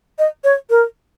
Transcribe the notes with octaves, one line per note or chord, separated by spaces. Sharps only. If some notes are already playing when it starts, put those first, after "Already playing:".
D#5
C#5
A#4